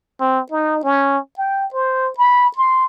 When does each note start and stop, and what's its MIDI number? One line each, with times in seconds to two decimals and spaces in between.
0.20 0.41 60
0.52 0.81 63
0.83 1.18 61
1.38 1.66 79
1.74 2.11 72
2.18 2.50 83
2.56 2.86 84